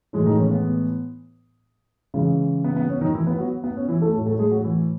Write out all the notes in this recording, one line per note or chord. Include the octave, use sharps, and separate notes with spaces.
A2 E3 G#3 G#4
D#3 D#4
C#4
B3
C#3 E3 G#3
B3
B3
C#4
D#3 D#4
E3 E4
B3 B4
F#3 F#4
B3
C#4
E3 E4
A3 A4
A2 F#3
A3 A4
G#3 G#4
F#3 F#4
E3 E4